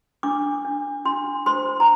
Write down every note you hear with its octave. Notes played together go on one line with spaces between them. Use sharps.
D4 D6
D4
D4 C6
C5 C6
A#5